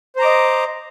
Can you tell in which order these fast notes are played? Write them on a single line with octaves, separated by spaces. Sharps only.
C5 A#5 D6 D#5